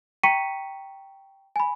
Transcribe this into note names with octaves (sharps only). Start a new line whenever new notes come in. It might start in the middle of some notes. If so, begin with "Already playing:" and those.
G5 A#5 C#6 B6 C#7 D#7
G#5 B5